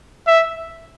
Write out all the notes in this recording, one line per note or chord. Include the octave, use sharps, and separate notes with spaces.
E5